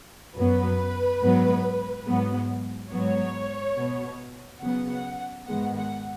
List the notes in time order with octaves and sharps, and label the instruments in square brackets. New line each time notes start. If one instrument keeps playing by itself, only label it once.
[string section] F#2 F#3 B3 B4
G#2 F#3 B3
G#2 F#3 B3
G#2 F#3 B3 C#5
B2 B3
C#3 F#3 B3 F#5
G#2 D#3 G#3 B3 F#5
F#5